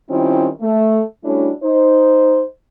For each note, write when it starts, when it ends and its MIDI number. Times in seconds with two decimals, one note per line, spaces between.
0.10 0.48 51
0.10 0.48 55
0.10 0.48 60
0.10 0.48 61
0.10 0.48 64
0.10 0.48 65
0.62 1.01 57
1.25 1.52 55
1.25 1.52 57
1.25 1.52 61
1.25 1.52 62
1.25 1.52 64
1.25 1.52 66
1.64 2.42 63
1.64 2.42 72